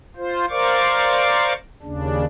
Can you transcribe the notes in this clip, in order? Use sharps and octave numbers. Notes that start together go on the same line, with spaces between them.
F4 C5
A#4 C5 D5 F5 C#6 D6
D#2 C#3 D4